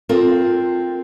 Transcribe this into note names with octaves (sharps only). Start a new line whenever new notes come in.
C4 F4 A4 A#4